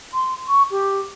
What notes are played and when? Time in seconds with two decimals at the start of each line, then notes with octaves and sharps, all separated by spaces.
0.14 C6
0.48 C#6
0.71 G4